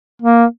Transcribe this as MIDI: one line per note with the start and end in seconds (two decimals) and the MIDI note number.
0.22 0.44 58